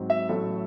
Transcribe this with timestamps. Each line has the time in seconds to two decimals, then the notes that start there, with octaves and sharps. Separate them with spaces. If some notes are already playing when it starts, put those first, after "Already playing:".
Already playing: G#2 F#3 C4
0.10 E5
0.29 A1 A2 F#3 A3 A4